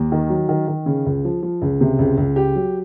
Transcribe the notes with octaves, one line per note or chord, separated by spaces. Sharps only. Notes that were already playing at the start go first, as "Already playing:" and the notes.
Already playing: D#2
D#3
F#3
D#3
D#3
C#3
C#2
F3
F3
C#2
C3
C#2
C#2
G4
F#3